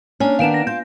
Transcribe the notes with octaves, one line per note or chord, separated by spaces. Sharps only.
A#3 C#4 D4 G#5
D#3 B3 D4 F5 D7 E7
A#6
F4 G6